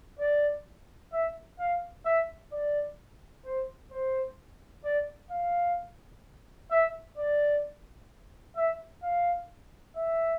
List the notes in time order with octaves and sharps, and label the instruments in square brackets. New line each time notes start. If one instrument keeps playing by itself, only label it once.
[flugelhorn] D5
E5
F5
E5
D5
C5
C5
D5
F5
E5
D5
E5
F5
E5